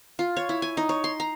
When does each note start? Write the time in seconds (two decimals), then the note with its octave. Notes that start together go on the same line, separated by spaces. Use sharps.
0.19 F4
0.37 C#5
0.49 E4
0.62 G#5
0.77 D#4
0.89 C#5
1.04 C6
1.20 A#5